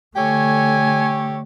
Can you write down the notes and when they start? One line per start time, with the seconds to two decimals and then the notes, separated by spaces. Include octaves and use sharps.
0.17 D3 A3 G4 A4 C#5 G#5